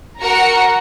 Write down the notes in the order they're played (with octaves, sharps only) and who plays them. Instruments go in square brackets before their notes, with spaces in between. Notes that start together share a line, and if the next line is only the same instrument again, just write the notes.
[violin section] F#4 A#4 C#7 [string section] F#5 A#5